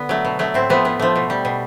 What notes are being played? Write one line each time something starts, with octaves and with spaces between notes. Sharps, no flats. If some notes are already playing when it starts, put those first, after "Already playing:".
Already playing: D3 B3
F#3 A3
B2
F#3 A3
A2 C4
F3 A3 B3
A2 B3
F3 A3
B2
G3
B2